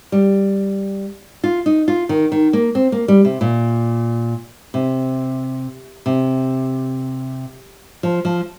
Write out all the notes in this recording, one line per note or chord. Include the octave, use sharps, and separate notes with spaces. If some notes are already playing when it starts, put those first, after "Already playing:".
G3
F4
D#4
F4
D#3
D#3
A#3
C4
A#3
G3
C3
A#2
C3
C3
F3
F3